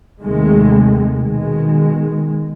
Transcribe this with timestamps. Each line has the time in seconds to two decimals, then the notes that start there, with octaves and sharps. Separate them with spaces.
0.22 D#2 C3 D#3 G#3 A3
1.18 B2 D#3 G#3